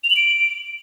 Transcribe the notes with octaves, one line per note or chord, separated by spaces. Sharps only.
F7
F#7
D7